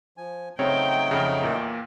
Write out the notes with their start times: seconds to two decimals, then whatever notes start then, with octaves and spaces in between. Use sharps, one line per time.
0.17 F3 G#5
0.59 C#3 F#3 A3 C4 D#4 C#5 G5
1.11 F2 C#3
1.41 E2 A#2 A#3